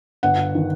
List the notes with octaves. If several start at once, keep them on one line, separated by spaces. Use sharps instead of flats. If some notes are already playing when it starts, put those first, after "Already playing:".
G1 F#5
D#3